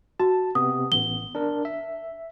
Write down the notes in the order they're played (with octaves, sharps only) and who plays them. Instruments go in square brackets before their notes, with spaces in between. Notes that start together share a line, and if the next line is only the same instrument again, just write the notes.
[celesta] F#4 [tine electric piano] A5
[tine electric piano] C3 B3 [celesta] D#6
[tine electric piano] A1 B3 [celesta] G7
[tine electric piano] D4 A#4
E5